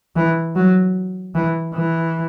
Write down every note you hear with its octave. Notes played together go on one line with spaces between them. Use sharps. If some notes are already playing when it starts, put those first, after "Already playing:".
E3
F#3
E3
E3